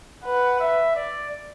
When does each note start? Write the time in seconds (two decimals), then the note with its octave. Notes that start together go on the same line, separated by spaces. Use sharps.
0.24 B4 F#5
0.60 E5
0.96 D5